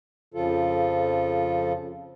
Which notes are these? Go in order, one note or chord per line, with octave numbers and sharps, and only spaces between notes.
F2 C#3 F3 F4 A4